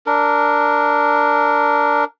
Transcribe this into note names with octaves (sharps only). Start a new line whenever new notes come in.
D4 A#4